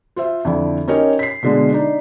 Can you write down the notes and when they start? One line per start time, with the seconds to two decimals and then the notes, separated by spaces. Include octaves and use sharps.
0.16 F4 C5 E5
0.45 F2 D3 E4
0.88 C#4 D#4 G4 A#4 C#5 D#5
1.19 B6 C7
1.43 B2 D3 G#3
1.72 D4 D#4